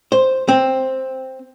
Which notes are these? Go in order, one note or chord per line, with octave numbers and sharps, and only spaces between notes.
C5
C4